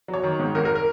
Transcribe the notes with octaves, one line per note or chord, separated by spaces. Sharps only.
F#3
C#5
D#3
G#2
G#1 A#4
A#4
A#4